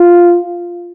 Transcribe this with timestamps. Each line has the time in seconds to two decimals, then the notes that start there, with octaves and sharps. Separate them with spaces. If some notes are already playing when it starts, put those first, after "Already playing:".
Already playing: F4